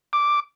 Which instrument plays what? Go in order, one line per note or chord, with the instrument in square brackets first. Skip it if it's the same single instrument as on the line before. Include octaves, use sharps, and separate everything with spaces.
[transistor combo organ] D6